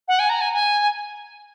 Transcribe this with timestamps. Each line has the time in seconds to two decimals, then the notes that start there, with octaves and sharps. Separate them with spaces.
0.08 F#5
0.19 G#5
0.29 A#5
0.41 G#5
0.53 G#5